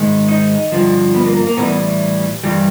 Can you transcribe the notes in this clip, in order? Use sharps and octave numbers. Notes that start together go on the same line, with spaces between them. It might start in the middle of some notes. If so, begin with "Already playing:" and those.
Already playing: G#2 D#3 G#3
D#4
G2 D3 F3
B3
A#3
A#3
A#3
A2 E3 G3 B3
G2 E3 G3